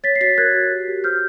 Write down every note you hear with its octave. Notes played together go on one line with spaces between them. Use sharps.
C#5 A6 B6
C7
F#4 A6 B6
A#4 F#6 G#6
F#4
G4
G4
C5 F6 G6